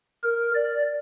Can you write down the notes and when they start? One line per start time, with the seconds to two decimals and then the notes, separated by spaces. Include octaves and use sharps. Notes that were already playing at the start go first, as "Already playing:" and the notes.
0.24 A#4
0.55 D5